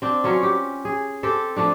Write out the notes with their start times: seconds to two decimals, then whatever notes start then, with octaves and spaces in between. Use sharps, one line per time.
0.02 C4 D4
0.24 F#3 C#4 F4
0.43 G4
0.85 G#4
1.23 C4 G4 A4
1.56 F3 A3 D4